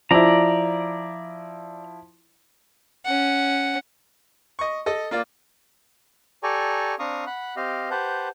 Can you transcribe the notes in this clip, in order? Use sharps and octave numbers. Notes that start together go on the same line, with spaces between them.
F3 E4 D5 A#5
C#4 F#5
D#5 C#6
A4 D#5
A#3 F4 D5
G4 A4 D5 G#5 A#5 C#6
C4 D4 F5 A#5 C#6 D#6
F#5 B5 F#6
C4 G4 D#5 F5
G4 B4 C5 F#5 A5 G6